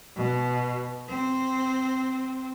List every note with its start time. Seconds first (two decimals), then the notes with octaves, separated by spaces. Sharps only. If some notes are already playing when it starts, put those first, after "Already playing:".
0.16 B2
1.09 C4